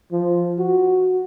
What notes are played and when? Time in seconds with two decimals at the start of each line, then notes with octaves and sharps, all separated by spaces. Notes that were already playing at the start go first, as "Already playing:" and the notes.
0.12 F3
0.59 F#4